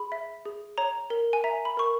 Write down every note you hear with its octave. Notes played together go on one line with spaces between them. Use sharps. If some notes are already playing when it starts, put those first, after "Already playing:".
Already playing: G#4 B5
E5
G#4
C#5 A#5
A#4
G#5
E5 A#5
B5
A#4 C#6